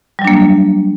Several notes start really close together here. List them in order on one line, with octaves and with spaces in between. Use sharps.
G3 F#3 D4 A#3